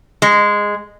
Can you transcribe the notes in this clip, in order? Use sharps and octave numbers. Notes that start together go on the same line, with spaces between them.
G#3